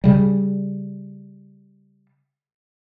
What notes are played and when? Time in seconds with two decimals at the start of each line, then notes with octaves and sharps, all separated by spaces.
0.04 C#3 G3